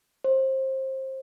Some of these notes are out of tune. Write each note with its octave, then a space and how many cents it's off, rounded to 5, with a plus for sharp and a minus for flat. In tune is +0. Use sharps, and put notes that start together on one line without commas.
C5 +25